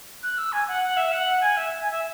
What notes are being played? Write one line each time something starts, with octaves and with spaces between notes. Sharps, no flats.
F#6
E6
G#5
F#5
F#5
E5
F#5
G#5
E5
G#5
E5